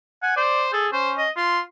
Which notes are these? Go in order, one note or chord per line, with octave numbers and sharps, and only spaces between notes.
F#5 G#5
C5 D5
G#4 A4
C#4 C5
D#5
F4 C6